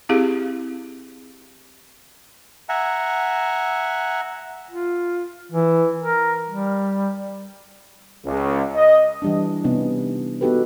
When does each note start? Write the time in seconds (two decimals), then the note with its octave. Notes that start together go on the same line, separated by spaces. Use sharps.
0.09 C4 E4 G4 G#4 F5
2.69 E5 F#5 G#5 A#5
4.71 F4
5.52 E3
6.01 A#4
6.49 G3
8.25 C#2
8.75 D#5
9.22 E3 G3 D4
9.64 C3 B3 C#4 D#4
10.41 B3 D#4 F#4 G4 A4 B4